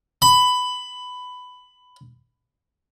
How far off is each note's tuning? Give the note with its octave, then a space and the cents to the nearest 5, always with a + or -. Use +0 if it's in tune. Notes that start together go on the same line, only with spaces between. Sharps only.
B5 +15